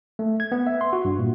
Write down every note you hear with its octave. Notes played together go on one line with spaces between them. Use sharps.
A3
G#6
B3
E5
C6
F#4
G2
A#2